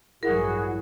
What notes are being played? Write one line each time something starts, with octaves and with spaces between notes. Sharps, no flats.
A1 G2 F#3 E4 F#4 G#4 A#4